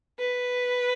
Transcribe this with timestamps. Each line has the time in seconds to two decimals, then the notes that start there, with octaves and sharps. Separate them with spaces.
0.19 B4